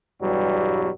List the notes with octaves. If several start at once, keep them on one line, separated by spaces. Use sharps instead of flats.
E2 G2 B2 F#3 G3